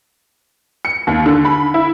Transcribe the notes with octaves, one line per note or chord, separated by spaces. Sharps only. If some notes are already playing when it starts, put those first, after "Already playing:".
C#7
D#2
D3
B5
E4